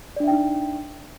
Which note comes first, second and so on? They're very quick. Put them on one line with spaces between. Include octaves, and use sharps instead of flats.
D5 D4 E5 G5 D#4